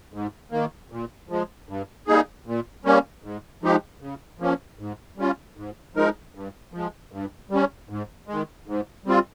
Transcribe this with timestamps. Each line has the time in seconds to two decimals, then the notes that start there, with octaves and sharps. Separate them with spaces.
0.13 G#2
0.52 D#3 A#3
0.91 A#2
1.29 F3 G#3
1.69 G2
2.07 G3 A#3 D#4 G#4
2.47 A#2
2.85 G3 A#3 C#4
3.24 G#2
3.63 F3 G#3 D#4 G4
4.01 C#3
4.40 F3 A#3 C#4
4.79 G#2
5.17 G3 C#4 F4
5.57 G#2
5.95 F3 G#3 D#4 A#4
6.35 G2
6.73 F3 G#3
7.12 G2
7.50 G3 C#4
7.89 G#2
8.28 D#3 G#3
8.67 G#2
9.06 G3 C4 F4